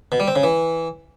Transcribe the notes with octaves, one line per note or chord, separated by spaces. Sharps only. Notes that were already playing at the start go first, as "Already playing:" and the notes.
B2
G3
C4
C#3
E3